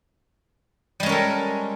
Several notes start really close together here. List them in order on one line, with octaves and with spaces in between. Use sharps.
G3 G#3 C#4 A#4 A4